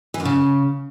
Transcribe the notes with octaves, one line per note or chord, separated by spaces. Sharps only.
E3
F#2
C#3